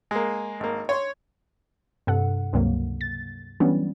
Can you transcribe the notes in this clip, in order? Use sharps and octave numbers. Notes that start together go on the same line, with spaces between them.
G#3 A#3
G#1 A#3
C#5 C6
G2 C3 A4 F#5
C#2 G2 C3 F#3 A#3
A6
E3 F#3 G3 B3 C#4 D4